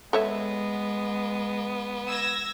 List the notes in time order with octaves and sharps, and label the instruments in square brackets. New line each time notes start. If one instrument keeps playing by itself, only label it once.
[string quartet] G#3 [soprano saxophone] B3 [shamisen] A4 C#5 E5
[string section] E6 G#6 A#6